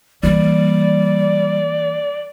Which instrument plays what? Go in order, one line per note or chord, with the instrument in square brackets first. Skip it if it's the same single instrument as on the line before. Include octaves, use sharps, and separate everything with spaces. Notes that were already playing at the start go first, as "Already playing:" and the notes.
[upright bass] E3 A#3 [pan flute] G3 [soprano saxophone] D5